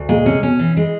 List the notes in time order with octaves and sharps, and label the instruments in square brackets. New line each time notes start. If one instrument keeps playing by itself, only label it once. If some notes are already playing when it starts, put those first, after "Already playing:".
Already playing: [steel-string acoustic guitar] D2
[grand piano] A#2 [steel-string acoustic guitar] G#3
[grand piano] C3 [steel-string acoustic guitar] C#4
[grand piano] B2 [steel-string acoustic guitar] C#4
[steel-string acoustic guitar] E3
G#3